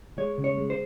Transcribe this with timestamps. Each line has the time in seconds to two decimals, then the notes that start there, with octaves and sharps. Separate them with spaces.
0.18 G#3 C#5
0.38 C#3
0.44 C#5
0.57 G#3
0.70 C5